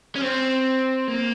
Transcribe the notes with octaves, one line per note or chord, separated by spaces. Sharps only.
C#4
C4
A#3